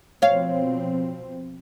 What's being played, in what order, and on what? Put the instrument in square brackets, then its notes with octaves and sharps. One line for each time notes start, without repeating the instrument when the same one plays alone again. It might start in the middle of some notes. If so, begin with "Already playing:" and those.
[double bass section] B2 F3 C4 [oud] C#5 F5